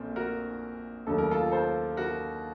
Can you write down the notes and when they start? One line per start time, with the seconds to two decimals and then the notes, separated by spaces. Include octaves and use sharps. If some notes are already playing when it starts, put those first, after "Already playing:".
Already playing: A#1 A#2 A3 C4
0.16 F#4 A#4
1.07 D#2 C#3 F#3 A3 A4
1.18 A#4
1.31 F4 A4
1.52 A4 C5
1.97 F#4 A#4